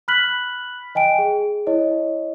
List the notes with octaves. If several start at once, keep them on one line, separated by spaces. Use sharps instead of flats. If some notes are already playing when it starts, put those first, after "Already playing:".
B5 F6 F#6 B6 F#7
D#5 G5 G#5 D7
G#4
E4 C#5 D#5